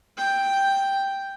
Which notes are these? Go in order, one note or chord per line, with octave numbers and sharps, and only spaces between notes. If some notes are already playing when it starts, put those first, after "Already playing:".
G5